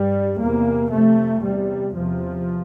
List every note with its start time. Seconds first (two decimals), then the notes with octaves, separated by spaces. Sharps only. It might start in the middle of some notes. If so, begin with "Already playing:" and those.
Already playing: G2 G3
0.40 E2 C3 A#3
0.91 F2 C3 A3
1.44 E2 C3 G3
1.96 E2 C3 F3